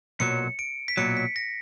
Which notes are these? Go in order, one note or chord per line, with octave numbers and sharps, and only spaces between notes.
B1 A#2 F#3 C#7
D7
B6
B1 A#2 F#3 C#7
B6
A#6